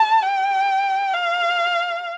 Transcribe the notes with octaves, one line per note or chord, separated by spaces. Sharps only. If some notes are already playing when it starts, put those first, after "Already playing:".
Already playing: A5
G5
F5